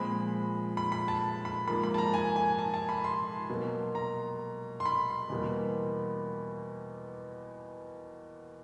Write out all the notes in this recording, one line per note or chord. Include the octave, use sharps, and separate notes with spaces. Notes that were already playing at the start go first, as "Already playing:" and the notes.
Already playing: A#2 F3 G#3 C4 B5
B5
B5
A5
B5
G#2 F3 A#3 B5
B5
A5
A#5
G#5
G#5
A5
A5
B5
C6
B2 F#3 A#3
A#5
C6
B5
E2 B2 G3 A#3